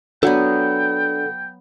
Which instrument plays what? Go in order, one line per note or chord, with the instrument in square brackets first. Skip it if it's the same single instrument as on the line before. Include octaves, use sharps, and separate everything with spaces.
[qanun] F#3 B3 [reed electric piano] D4 D5 [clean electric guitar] A4 F#5 [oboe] G5